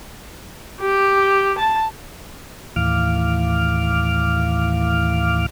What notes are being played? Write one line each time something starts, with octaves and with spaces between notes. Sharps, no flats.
G4
A5
D#2 A2 E3 F5 D6 F6